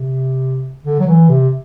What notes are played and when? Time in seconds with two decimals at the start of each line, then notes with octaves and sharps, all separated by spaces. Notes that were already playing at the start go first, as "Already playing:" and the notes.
Already playing: C3
0.85 D3
1.00 F#3
1.07 E3
1.29 C3